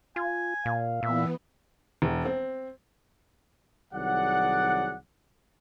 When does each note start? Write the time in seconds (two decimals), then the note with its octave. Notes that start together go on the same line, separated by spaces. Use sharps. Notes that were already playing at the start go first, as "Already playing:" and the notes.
0.16 F4 G#5
0.65 A#2 F5
1.03 A#2 E3 B3 E5
2.02 E1
2.25 C4
3.93 C2 D#3 F#3 G#4 D5 F#5